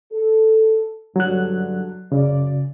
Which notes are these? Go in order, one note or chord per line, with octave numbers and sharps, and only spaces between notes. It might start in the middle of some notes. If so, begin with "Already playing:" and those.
A4
F#1 G2 D3 F#3 F#6
F#2 C#3 D5